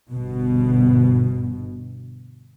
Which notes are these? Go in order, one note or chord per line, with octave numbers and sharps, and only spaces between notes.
G1 B2